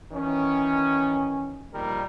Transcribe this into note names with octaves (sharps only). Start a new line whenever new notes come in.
D#3 E3 C#4
A#1 A#2 D#3 G3 A#4